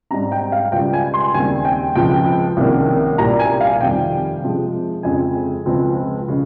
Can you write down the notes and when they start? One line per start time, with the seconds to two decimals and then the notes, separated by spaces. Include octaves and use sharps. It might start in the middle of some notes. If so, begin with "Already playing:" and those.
0.10 G#2 G3 C4 A#5
0.32 G5
0.52 F5
0.72 C#2 C#3 G3 G5
0.93 G#5
1.14 C6
1.33 D#2 C#3 G3 C4 G#5
1.65 G5
1.95 C#2 C#3 F3 C4 G5
2.57 C2 C3 D#3 A#3 C#4
3.18 C2 A#2 G3 A#5
3.39 G#5
3.61 F5
3.81 F2 C3 D#3 G3 G5
4.43 C3 F3 G#3
5.03 F2 C#3 G#3 C4 G#5
5.66 C#2 C#3 F3 C4
6.28 C#3 G#3